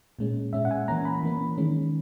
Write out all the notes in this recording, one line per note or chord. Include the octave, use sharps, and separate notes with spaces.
A#2 G#3 C#4
A#2 G#3 C#4 E5
F#5
G#5
E3 A#3 C#4 A#5
B5
E3 A#3 C#4
D#3 G#3 C#4